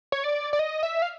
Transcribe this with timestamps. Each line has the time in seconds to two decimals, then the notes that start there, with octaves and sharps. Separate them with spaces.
0.12 C#5
0.24 D5
0.53 D5
0.59 D#5
0.83 E5
1.02 F5